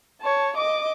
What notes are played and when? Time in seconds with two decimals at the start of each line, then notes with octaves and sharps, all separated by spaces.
0.21 C#5 A5
0.57 D#5 D6